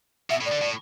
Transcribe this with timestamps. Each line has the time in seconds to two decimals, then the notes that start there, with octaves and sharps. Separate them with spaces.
0.30 B2 E5
0.41 A2
0.46 D5
0.52 D3
0.62 A2